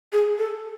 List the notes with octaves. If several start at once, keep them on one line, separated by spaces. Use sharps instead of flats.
G#4
A4